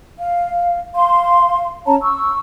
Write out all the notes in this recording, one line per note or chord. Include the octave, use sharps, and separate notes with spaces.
F5
F5 C6
C#4 C#5 A5 A#5
C#6 E6